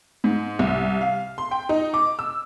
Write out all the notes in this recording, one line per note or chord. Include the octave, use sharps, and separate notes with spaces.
G#2
C2
F5
C6
G5
D#4
D6
E6